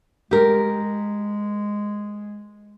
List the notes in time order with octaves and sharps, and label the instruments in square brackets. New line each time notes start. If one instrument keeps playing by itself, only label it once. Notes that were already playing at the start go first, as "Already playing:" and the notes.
[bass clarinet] G#3 [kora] G4 A#4